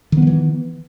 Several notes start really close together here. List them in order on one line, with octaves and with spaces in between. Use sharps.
D#3 B3 F#3 E3